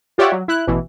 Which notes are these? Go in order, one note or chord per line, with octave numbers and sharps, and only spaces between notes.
F4 G4 C#5 D5 E5 F#5
F#3
E4 F#6
A1 B2 E3